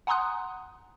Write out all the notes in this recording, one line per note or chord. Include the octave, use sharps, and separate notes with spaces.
F#5 G#5 A#5 C6 D#6 F#6